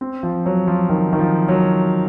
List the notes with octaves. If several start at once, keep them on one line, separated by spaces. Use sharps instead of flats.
C4
F3
F#3
F3
D#3
D#3
F3
F#3